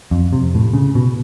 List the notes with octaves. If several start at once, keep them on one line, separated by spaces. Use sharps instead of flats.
F2
C3
A2
C#3
B2